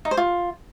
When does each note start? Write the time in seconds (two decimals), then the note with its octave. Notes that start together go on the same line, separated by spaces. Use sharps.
0.05 D#4
0.11 C5
0.17 F4